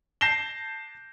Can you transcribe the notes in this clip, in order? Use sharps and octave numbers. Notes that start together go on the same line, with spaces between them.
A5 G6 A#6 C7 E7 G7